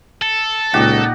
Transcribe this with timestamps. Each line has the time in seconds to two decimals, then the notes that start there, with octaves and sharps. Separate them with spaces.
0.22 A4
0.74 C#2 A#2 D#4 F#4 G4